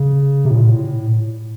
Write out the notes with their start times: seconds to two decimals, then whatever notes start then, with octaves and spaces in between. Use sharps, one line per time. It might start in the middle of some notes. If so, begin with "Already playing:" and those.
Already playing: C#3
0.45 C3
0.51 A2
0.55 A#2
0.65 A2